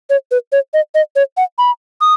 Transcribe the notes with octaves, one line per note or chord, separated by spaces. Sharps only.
C#5
B4
C#5
D#5
D#5
C#5
F#5
B5
D#6